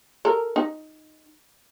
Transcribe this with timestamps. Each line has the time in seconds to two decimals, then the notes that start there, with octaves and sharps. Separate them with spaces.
0.25 A4 A#4
0.56 D#4